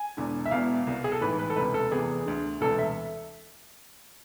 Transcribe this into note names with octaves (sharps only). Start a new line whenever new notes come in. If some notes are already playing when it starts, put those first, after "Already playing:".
Already playing: G#5
E1 E2 D3
E5
E1 E2 B2 F5
C2 B2
G#4
A4
A1 G#2 E3 B4
B4
A4
E1 D2 C3 B4
A4
F1 E2 C3 E3 G#4
D2 D3
E1 D2 C3 E3 A4
E5